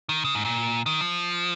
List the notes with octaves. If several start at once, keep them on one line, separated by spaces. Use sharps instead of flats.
D#3
C#3
G#2
A#2
D#3
F3